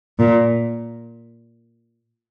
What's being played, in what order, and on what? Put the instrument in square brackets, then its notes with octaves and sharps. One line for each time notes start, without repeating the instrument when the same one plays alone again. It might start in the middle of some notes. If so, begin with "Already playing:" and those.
[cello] A#2